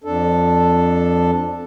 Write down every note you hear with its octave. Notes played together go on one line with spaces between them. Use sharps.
F2 D4 A4